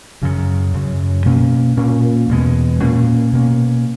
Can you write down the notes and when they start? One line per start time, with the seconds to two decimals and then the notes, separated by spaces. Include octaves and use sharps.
0.22 F#2 C#3 F#3
0.74 F#2 C#3 F#3
1.25 B2 A#3 C#4
1.77 A#2 A#3 C#4
2.29 E2 B2 G#3
2.81 A#2 A#3 C#4
3.33 B2 A#3 C#4